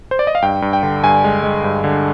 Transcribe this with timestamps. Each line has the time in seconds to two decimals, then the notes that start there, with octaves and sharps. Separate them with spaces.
0.11 C5
0.19 D5
0.27 D#5
0.35 F5
0.42 G2 G5
0.62 G2
0.73 G5
0.83 D3
1.04 G2 G#5
1.24 G#3
1.44 G#3
1.64 G2
1.84 D3